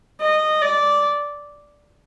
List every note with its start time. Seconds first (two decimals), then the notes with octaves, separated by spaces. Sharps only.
0.21 D#5
0.62 D5